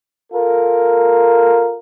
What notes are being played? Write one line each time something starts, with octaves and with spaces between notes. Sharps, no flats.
F4 A4 A#4